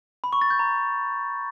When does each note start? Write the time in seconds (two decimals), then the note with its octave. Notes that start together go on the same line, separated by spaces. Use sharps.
0.24 B5
0.33 C#6
0.42 A6
0.50 G6
0.59 A#5